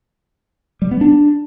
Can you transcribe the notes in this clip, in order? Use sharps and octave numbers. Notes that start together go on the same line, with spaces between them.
G3
B3
D4